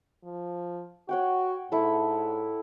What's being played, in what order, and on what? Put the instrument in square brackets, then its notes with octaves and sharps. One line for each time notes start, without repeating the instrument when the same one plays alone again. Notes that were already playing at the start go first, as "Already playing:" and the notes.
[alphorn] F3
[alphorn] F#4 [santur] C#5 F#5 G5
[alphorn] G#2 [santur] E4 A4